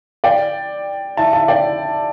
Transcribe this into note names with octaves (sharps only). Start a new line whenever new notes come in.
D5 G5
E5 A5
E5 A5
D5 G5